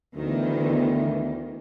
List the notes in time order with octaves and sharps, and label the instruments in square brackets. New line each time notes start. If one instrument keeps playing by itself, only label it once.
[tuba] D2 [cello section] D#3 E3 B3